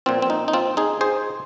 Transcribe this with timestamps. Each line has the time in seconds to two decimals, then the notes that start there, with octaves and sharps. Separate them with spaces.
0.06 A#2 F3 A#3 C4 F4
0.22 C4
0.30 D#4
0.48 D#4
0.53 C4 F4
0.77 D#4 G#4
1.01 G#4 C5